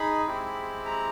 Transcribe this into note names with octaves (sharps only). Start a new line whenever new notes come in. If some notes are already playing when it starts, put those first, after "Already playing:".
Already playing: D#4 G#4 B5
G#3 C4 E4 G4
A#5